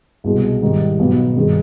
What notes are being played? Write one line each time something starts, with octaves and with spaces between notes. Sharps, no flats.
C2 B2 G#3
G#2 D#3 G3
B1 B2 B3
G2 D#3 G#3